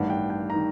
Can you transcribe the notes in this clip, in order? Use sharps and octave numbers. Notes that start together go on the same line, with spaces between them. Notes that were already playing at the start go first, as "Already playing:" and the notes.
Already playing: A1 G2 D#3 F#5
G5
G5
D#3 A#5